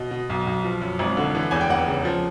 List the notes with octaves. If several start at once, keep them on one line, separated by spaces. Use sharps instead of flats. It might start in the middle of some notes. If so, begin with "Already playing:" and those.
Already playing: B2 D#5
B2
B1
B1
F3
F#2
G#1
D3
E3
E2 G#5
G5
F1 F#5
C#3
F3